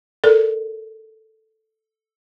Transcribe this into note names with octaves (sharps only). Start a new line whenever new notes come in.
A4 A#4 D5